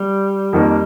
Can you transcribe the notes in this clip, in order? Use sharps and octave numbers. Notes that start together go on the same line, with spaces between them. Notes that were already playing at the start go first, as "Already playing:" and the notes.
Already playing: G3
F2 D#3 A#3